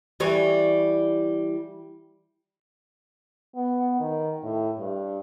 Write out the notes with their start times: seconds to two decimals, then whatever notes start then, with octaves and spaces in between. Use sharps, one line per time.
0.20 E3 G3 C#5
3.55 B3
4.00 D#3
4.44 A2
4.79 G2